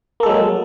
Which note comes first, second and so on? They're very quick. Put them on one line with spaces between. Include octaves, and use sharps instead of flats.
A#3 A4 G#3 F#3